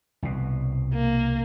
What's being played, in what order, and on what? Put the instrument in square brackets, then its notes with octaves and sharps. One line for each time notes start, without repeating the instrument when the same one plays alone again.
[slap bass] C2 B2
[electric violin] A#3